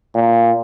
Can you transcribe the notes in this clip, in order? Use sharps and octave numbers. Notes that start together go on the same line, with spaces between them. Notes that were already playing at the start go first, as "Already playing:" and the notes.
A#2